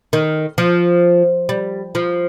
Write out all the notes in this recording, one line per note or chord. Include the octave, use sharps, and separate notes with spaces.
D#3
F3
G3
F3